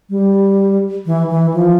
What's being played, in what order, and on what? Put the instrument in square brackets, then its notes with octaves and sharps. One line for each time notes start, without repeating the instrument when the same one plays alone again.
[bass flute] G3
E3
E3
F3